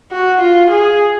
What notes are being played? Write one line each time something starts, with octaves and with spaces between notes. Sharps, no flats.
F#4
F4
G#4